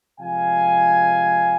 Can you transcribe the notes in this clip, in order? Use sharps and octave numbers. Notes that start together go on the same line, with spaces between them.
C3 F3 G#3 F5 G#5